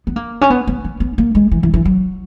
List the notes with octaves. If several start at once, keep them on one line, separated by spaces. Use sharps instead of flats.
B3
A#3
C#4
B3
B3
B3
B3
A#3
G#3
E3
E3
E3
F#3